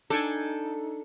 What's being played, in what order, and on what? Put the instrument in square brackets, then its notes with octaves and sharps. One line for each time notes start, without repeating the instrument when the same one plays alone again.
[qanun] D4 G5 G#5 [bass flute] D#4 [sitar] A4